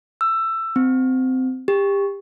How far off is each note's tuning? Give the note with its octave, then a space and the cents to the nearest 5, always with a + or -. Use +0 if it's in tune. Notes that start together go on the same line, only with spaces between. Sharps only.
E6 +15
C4 -20
G4 +25